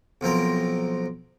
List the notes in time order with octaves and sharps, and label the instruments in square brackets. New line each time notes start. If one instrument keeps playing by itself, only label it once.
[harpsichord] B1 F3 C4 A#4